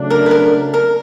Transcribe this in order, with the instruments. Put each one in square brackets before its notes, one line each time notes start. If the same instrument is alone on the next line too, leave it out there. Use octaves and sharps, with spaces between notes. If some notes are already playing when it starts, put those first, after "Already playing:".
Already playing: [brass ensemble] C#3 F#3 A3 D4
[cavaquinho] A#4
B4
A#4
A#4